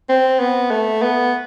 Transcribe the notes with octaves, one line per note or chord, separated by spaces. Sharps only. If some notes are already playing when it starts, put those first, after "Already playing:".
C4
B3
A3
B3